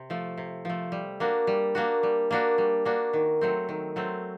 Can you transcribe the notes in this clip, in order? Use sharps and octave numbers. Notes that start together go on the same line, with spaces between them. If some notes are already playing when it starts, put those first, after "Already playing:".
Already playing: C3
F3 A3
C3
F3 A3
G3
A#3 D4 F#4
G3
A#3 D4 F#4
G3
A#3 D4 F#4
G3
A#3 D4 F#4
D#3
F#3 A3 C4
D#3
F#3 A3 C4